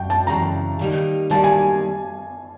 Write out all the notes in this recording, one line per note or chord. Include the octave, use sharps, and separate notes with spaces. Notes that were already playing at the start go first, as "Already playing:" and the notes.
Already playing: F#2 G5
A5
F#2 C#3 E3 A#5
D#3 G3 A#3 D#4
D#3 G3 A#3 D#4 A5
G#5